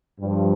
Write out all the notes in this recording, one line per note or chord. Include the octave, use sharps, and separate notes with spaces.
G2
F3